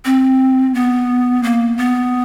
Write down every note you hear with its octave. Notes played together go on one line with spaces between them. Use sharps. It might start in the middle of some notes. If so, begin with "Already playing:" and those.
C4
B3
A#3
B3